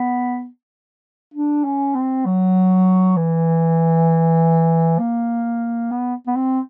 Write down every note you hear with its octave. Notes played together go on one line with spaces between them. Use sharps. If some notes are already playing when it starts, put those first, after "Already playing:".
Already playing: B3
D4
C#4
C4
F#3
E3
A#3
B3
B3
C4